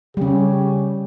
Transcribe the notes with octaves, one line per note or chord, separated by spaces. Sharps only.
C#3 G3 C#4 G4